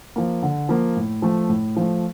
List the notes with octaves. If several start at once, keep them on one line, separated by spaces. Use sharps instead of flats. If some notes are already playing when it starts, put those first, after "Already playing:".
F3 A#3
D3
F3 A#3
A2
F3 A3
A2
F3 A3